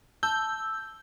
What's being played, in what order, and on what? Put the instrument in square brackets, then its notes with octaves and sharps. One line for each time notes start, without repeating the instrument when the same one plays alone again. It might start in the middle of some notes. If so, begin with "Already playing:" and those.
[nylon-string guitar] A5 [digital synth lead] E6 [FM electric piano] G6